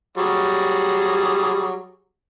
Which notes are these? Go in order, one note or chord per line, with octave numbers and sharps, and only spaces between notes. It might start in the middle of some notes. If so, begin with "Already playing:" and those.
F#3 G3 G#4